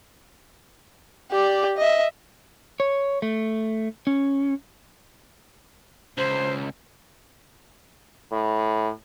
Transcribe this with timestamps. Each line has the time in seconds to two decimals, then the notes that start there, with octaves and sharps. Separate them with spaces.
1.31 G4 D5
1.77 D#5 E5
2.80 C#5
3.22 A3
4.07 C#4
6.18 C#2 C5
8.32 A2